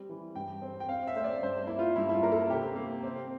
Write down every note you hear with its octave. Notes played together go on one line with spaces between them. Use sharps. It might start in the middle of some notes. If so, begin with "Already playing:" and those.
Already playing: G3 C4
E3
G2 G5
C4
G5
C4 F5
E5
A3 C5
D5
G2 C5
A#3 E4
F4
G2 E4
E4
F4
A#3 A#4
A4
C3 G4
A#3
C4